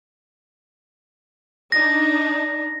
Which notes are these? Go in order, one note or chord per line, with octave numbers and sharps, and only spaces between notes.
D4 D#4 A#6